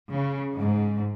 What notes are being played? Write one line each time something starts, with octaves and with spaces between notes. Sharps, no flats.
C#3
G#2